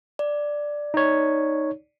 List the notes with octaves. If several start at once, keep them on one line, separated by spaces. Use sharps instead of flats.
D5
D#4 C#5